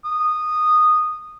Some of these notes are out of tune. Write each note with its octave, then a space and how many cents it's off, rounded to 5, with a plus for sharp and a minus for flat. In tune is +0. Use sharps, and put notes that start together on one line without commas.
D#6 -15